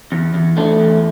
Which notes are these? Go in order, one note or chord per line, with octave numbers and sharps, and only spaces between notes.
E2
E2
A3 D4
E2